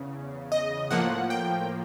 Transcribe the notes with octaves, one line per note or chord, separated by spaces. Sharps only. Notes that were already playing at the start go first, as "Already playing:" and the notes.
Already playing: E2 C#3
D#5
A2 F3 A#3 F#5
G5